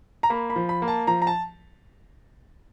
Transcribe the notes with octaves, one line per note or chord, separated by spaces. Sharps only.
A#5
A#3 B5
B5
F3
B5
A#3
A5
F3 A#5
A#5
A5